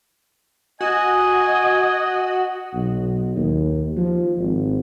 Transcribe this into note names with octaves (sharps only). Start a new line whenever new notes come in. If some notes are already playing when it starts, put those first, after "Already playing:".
F#4 D#5 G#5
B1
D#2
F3
G#1